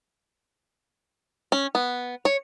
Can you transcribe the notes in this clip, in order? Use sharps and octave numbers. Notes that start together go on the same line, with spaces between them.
C#4
B3
C#5